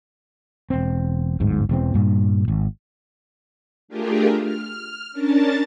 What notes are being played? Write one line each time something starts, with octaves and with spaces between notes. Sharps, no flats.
E1 C4
D1 G1 G#2
E1 E2 C4
G2 A#2
G#1
A3 D4 F4 G4 G#4 A#4
F6
C#4 D4 A#4 A5 A6